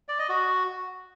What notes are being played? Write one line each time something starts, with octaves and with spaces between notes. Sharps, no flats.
D5
D#5
F#4